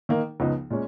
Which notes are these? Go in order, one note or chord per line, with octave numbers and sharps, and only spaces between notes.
D#3 A#3 D#4 A#4
C#2 C#3 F3 B3 D#4
A#2 G#3 C#4